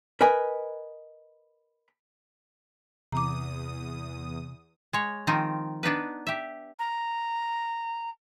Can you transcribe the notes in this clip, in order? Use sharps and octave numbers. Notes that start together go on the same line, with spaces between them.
A#4 B4 D#5 G#5
E2 C3 A#5 D6 D#6
G#3 C#5
D#3 F3 C4 D#4
B3 D4 D#4 B4
G4 E5
A#5